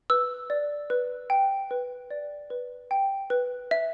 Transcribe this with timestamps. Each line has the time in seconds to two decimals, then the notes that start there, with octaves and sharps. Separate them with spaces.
0.10 B4 E6
0.50 D5
0.90 B4
1.30 G5
1.71 B4
2.11 D5
2.50 B4
2.91 G5
3.30 B4
3.71 E5